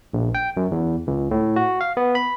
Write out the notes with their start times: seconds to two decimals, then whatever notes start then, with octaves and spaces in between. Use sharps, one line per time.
0.14 A#1
0.35 G5
0.57 F#2
0.72 E2
1.07 C#2
1.31 A2
1.56 F#4
1.81 F5
1.97 B3
2.15 B5